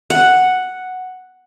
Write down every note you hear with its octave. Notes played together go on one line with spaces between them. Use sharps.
F#5